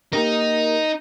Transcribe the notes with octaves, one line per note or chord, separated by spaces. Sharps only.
A#3 D#4 G4 A#4